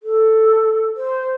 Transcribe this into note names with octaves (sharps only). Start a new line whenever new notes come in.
A4
C5